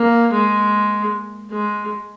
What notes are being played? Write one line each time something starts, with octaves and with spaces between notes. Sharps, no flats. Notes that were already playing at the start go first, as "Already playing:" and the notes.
Already playing: A#3
G#3
G#3